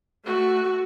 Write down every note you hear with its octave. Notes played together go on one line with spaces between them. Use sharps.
A3 F#4